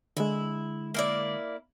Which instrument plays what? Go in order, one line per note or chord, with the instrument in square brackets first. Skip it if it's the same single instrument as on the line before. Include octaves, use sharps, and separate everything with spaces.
[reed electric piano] D3 G#3 [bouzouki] E4
[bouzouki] A#3 E4 D5